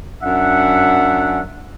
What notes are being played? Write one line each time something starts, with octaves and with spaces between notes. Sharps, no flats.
F#2 D4 E5 F#5